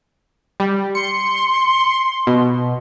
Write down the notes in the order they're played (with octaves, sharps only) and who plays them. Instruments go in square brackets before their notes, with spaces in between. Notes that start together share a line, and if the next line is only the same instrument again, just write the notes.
[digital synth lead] G3
[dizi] C6 [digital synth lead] C#7
[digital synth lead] B2